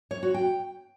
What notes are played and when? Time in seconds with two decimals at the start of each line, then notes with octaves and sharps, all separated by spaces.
0.11 C#5
0.23 F#4
0.34 G5